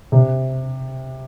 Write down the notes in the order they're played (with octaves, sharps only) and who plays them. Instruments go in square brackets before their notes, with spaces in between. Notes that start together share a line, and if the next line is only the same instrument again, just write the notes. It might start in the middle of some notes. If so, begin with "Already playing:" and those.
[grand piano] C3